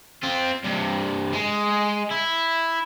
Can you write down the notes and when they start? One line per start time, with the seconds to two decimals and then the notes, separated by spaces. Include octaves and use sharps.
0.24 C4 F4
0.65 G2 C3
1.33 G#3
2.11 E4